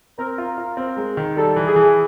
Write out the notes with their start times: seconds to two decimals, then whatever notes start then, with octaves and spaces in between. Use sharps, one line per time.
0.18 C4 A#4
0.38 F4
0.58 F4
0.77 C4
0.97 G#3
1.17 D#3
1.36 G3 A4
1.56 E3
1.66 G#4
1.76 E3